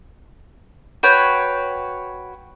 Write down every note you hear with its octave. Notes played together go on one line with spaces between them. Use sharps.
F#4 B4 C#5 G5